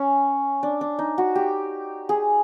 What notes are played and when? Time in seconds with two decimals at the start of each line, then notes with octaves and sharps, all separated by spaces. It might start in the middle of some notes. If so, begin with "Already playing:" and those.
Already playing: C#4
0.63 D4
0.81 D4
0.99 D#4
1.18 F#4
1.35 G4
2.09 G#4